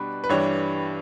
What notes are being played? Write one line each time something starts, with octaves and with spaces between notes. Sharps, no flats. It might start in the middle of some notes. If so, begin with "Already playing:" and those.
Already playing: B2 G3 D4 B4
B4
G2 E3 G3 D4 C#5